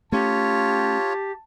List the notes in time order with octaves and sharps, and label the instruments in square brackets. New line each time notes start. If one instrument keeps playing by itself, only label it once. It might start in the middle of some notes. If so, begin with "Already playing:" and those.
[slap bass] A3 C#4 [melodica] F4 C#5 [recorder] G4 [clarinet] A5